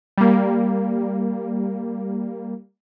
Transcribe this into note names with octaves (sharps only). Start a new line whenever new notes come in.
G3 A#3